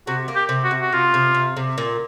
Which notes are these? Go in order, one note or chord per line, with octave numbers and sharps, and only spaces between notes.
C3 F#4
A#3
G4
C3
F#4
C3
F#4
C3 F4
C3
C3
C3
A#2